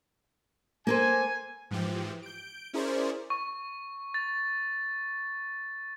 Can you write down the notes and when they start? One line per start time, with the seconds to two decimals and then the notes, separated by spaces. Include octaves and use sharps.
0.87 A#3 A4 C5 G#5
1.71 G#2 E3 F3 G4
2.23 G6 D7
2.73 C#4 E4 G#4 A#4 C5 D5
3.30 C#6
4.14 A6